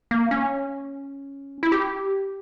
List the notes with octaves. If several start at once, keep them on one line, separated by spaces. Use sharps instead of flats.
A#3
C#4
E4
G4